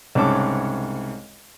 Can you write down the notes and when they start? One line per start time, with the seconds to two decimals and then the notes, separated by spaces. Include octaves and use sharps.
0.15 C2 G#2 C#3 C#5 A5 D6